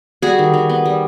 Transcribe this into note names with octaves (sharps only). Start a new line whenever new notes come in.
G3 F#4 G#4
D#3
D#3
B3
G3